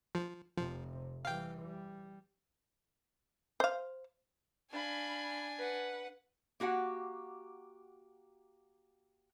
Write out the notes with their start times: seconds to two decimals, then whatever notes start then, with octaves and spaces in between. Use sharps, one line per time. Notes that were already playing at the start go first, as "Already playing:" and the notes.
0.15 F3
0.57 F1 C3 F3
1.25 E3 G3 F5 G5
1.65 G3
3.60 C5 F5
4.72 D4 F5 G#5 B5
5.58 B4 F#5
6.60 A#3 F#4 G4 F#5